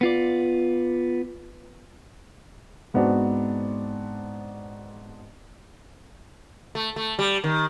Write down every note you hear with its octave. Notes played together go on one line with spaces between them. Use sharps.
B3 F4 D5
G#2 B3 C4 D4 F#4
A3
A3
G3
D#3